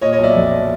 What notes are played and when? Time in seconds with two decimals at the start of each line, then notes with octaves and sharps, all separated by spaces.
0.01 A#2 C#5 D#5
0.12 C#5 D#5
0.18 B1
0.23 D5 E5
0.35 F2